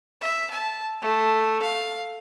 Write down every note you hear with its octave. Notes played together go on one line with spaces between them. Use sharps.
E5
A5
A3
F5